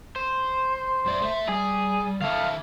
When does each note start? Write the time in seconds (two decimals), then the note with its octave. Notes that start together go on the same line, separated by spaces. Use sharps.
0.16 C5
1.06 F#2 D5 E5
1.22 A3 E5
1.49 G3 G#4
2.22 D#3 A4 E5 F5